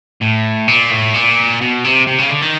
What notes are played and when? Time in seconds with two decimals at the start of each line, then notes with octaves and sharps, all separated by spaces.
0.21 A2
0.68 A#2
0.91 A2
1.14 A#2
1.61 B2
1.84 C3
2.07 C3
2.19 C#3
2.31 D3
2.42 D#3